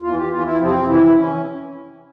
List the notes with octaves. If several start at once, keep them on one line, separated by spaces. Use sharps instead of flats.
E2 F4
E3
G4
E2 E3 F4
E4
F2 C3 F3 C4
F2 C3 E3 E4
E3 C#4